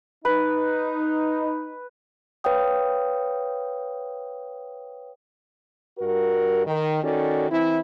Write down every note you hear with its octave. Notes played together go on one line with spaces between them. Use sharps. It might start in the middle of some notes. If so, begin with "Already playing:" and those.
D#4 B4
B4 C#5 F5 G5 D#6
G2 F#4 A#4
D#3
D#3 C#4 F#4 A4 D5
E3 C4 E4